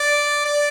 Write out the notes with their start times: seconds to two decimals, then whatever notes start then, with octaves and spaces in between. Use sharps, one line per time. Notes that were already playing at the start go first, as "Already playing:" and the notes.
Already playing: D5
0.45 D5